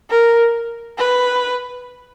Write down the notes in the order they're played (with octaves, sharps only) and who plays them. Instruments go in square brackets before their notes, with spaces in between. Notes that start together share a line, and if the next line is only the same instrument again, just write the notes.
[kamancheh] A#4
B4